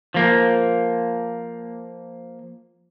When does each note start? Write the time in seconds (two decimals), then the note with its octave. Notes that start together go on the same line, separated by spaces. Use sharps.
0.14 F3 A#3